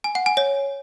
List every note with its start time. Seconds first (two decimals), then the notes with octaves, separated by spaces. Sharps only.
0.04 G#5
0.15 F#5
0.26 G#5
0.37 C#5